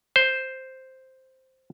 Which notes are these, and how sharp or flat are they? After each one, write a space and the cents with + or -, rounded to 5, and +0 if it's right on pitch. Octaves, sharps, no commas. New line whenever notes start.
C5 +0